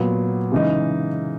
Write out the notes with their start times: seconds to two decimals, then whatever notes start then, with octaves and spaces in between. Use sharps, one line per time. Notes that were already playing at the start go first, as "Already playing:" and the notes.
Already playing: A#2 F#3 B3
0.51 C#3 E3 G#3 D#4